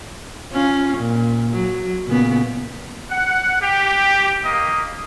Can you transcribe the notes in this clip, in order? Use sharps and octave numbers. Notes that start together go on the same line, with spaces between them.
C#4 F4
A#2
F#3
A#2 C#3 B3
F#5
G4
A#3 D#5